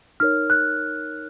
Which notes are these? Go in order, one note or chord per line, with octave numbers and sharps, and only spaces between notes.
D#4 A#4 C#5 F6
F#6